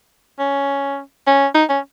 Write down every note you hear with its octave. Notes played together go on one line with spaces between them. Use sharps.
C#4
C#4
D#4
C#4